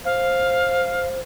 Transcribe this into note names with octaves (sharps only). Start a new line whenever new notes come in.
C5 F5